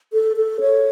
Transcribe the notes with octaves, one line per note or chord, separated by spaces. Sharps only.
A4
A4
C#5